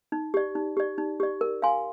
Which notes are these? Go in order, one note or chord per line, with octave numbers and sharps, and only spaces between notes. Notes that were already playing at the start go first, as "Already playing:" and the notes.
D#4
G4 D5
D#4
G4 D5
D#4
G4 D5
A#4
F5 G#5 C6